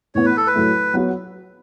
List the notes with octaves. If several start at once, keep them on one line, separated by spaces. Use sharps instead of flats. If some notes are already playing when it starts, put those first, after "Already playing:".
A2 E3 B3 C#5
B4
A4
B4
A2 F#3 A3 E4
F#3 B3 F#4